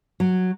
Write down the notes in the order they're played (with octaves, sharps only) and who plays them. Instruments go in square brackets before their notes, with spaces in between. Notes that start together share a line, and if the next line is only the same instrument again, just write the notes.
[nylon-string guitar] F#3